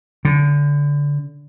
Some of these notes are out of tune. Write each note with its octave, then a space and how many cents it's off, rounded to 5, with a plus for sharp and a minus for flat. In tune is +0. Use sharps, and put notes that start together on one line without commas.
D3 -25